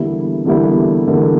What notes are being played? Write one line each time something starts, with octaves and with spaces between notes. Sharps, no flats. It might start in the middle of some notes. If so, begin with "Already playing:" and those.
Already playing: E2 D3 G3 A#3 E4
E2 D3 G3 A#3 E4
E2 D3 G3 A#3 E4